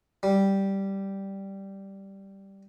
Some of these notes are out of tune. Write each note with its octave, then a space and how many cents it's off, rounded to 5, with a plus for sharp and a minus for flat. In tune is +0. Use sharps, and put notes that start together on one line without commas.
G3 -5